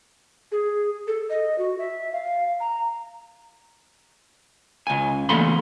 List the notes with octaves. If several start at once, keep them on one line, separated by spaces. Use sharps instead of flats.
G#4
A4
D#5
F#4
E5
F5
A#5
C#2 G#5
E2 A3 A#3 G#5 B5 C6